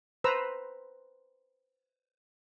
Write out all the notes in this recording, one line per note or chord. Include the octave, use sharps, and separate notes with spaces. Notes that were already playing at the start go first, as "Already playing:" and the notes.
B4 C5 A#5 E6